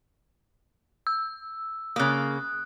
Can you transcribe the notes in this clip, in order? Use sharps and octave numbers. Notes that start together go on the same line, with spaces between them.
E6
C#3 A#3 D#6 F#6